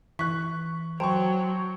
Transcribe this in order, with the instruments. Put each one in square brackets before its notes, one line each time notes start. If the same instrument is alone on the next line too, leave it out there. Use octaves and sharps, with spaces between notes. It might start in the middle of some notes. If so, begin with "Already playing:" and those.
[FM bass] E3 [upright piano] C#6 F#6 [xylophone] B6
[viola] F#3 [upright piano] C5 C#6 [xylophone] G5 A5 A#5